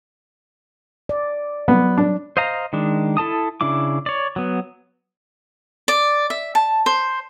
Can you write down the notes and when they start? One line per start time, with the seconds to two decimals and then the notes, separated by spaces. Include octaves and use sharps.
1.09 D5
1.68 F#3 B3
1.97 D4
2.37 C5 D#5 F5 A#5
2.73 D#3 G#3 D4
3.17 E4 A4 A5 D#6
3.61 C#3 D4 E4 D6
4.06 C#5 D5
4.36 F#3 B3
5.88 D5
6.30 E5
6.55 A5
6.86 C5